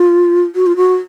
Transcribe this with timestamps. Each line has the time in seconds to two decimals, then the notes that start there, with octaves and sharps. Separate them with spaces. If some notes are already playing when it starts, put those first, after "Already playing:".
Already playing: F4
0.55 F#4
0.66 F4
0.76 F#4